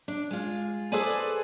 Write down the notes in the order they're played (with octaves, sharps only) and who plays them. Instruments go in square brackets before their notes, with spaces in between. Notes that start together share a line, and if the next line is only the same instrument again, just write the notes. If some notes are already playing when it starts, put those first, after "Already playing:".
[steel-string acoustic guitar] D4
G#3 F4
G#4 A4 B4 C5 D5 G#5